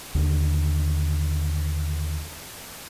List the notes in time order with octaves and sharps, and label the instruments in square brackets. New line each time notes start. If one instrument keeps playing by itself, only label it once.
[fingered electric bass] D#2 D3